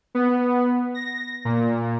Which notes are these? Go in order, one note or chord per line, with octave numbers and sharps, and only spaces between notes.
B3
A#6
A#2